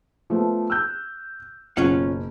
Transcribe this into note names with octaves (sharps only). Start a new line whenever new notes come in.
F3 A3 B3
E6 F#6 G6
F#1 B1 C#4 F4 F#5